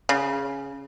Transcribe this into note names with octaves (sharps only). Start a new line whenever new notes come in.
C#3